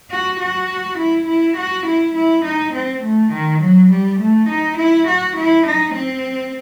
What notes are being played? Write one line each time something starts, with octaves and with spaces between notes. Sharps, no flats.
F#4
F#4
E4
E4
F#4
E4
E4
D#4
C4
A3
D#3
F#3
G3
A3
D#4
E4
F#4
E4
D#4
C4